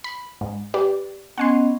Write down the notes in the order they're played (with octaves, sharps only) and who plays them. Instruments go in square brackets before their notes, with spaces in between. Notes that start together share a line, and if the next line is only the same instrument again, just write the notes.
[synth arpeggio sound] B5
G#2
G4 B4 D5
[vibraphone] B3 C#4 D#5 [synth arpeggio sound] F#5 G#5 C6